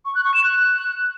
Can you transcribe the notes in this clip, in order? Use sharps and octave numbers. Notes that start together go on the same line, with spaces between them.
C#6
F#6
C#6
E7
F#6